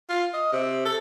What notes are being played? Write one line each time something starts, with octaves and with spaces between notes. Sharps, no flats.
F4
D#5
C3
A4